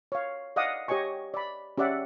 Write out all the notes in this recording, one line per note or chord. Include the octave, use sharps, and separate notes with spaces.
C#5 F5
D5 D#5 F5 F#5 D6 D#6
G4 C#5 D#5 G#5 C#6
D5 B5
C#4 G4 D5 E5 F#5